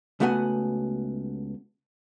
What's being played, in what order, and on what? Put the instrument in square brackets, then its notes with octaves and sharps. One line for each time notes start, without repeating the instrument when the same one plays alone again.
[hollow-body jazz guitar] C#2 A3 B3 F#4 F#5 G#5